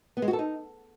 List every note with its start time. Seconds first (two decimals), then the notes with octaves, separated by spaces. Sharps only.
0.17 B3
0.22 G#3
0.28 F#4
0.33 A4
0.39 D#4